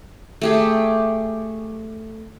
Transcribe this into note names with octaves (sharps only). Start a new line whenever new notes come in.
A3 G4 G#4